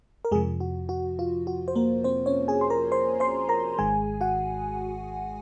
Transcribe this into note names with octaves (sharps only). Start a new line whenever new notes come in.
A#4
F2 C3 F3 G#3 G#4
F#4
F#4
F4
F#4
C5
A#3 A#4
C4 C5
C#4 C#5
G#4 G#5
C6
A#4 A#5
C5 C6
C5 C6
A#4 A#5
G#1 G#2 D#3 G#3 G#4 G#5
F#4 F#5